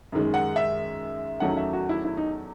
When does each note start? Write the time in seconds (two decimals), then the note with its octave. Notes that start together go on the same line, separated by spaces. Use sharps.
0.12 F#2 D#3 G#3
0.34 F#5
0.56 E5
1.40 E2 D#3 F#3 A3 C#4 F#5
1.57 E5
1.73 F#4
1.89 E4
2.05 E4
2.17 D#4